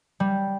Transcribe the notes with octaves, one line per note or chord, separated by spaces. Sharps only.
G3